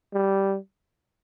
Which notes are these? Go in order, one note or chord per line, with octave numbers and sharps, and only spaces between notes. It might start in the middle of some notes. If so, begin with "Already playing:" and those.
G3